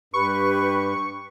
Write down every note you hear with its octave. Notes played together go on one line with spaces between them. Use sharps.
G2 G4 B4 B5 C#6